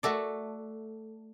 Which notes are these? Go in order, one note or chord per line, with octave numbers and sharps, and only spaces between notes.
A3 F#4 A4 D5